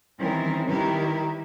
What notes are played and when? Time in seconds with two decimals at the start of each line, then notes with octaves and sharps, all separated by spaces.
0.18 D#3 E3 G3 C4 C#4 A#4
0.67 D#3 G3 E4 G4 A#4 B4